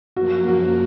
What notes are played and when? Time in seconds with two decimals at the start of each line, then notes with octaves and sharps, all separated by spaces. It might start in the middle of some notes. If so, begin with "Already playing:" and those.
0.16 F#2 F3 A#3 F#4
0.48 F#4